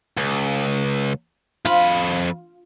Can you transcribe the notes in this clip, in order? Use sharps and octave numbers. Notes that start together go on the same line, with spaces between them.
C#2
F2 F4 B5